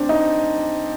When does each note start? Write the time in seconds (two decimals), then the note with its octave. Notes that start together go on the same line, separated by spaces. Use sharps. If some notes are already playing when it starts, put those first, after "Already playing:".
Already playing: C4 D4
0.09 D#4